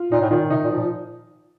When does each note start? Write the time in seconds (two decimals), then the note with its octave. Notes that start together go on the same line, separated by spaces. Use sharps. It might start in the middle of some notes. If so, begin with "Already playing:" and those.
Already playing: F4
0.12 A#2 D#4
0.21 A2
0.30 A#2 D#3
0.50 C3 D#4
0.64 A#2
0.70 F3
0.77 A#2